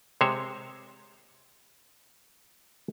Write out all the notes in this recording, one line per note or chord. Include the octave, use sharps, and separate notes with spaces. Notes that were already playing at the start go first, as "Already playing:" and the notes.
C3 G#3 C5 C#5